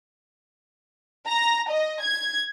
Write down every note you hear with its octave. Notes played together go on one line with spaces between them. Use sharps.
A#5
D#5
G#6